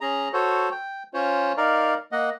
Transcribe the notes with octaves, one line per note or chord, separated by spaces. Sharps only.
C#4 G#4 A#5
F#4 A4 C5 C#5
G5
C#4 F4 C5 C#5
D#4 A#4 D5 F5
A#3 D#5 F#5